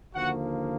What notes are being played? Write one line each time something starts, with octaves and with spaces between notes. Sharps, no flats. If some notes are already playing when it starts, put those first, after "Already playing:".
D#2 D3 F3 A#3 F#4 F#5